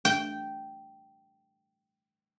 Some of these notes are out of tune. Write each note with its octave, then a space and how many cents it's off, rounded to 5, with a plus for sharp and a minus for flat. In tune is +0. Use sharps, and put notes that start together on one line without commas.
G5 -10